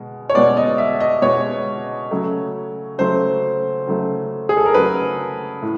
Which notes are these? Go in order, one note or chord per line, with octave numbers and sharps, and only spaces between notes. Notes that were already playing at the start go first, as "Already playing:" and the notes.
Already playing: B2 G#3
C#5
B2 G#3 B3 D5
D#5
E5
D#5
B2 G#3 B3 C#5
C#3 F#3 A3
C#3 F#3 A3 C5
C#3 F#3 A3
G#4
A4
A#4
C#3 F#3 A3 B4
A2